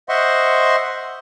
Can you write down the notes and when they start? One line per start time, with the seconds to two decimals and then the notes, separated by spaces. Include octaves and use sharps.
0.09 C5 D#5 E5 F#5 C6 C#6